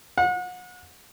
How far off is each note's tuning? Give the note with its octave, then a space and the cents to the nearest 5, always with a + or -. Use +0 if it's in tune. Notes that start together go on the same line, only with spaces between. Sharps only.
F#5 -35